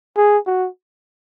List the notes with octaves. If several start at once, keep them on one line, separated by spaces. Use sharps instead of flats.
G#4
F#4